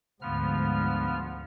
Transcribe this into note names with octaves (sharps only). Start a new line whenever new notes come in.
D2 G#2 F3 B3 F6